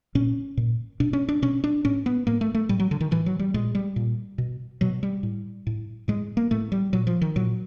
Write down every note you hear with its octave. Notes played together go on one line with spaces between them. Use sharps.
A#2 C#4
A#2
B2 D4
C#4
D4
B2 C#4
D4
A2 C#4
B3
A2 A#3
A3
A3
A2 G3
F#3
D3
D#3
A2 E3
F#3
G3
A#2 G#3
G3
A#2
B2
B2 F#3
G3
A2
A2
A2 G#3
A#3
A2 A3
G3
A#2 F#3
F3
D#3
A#2 F#3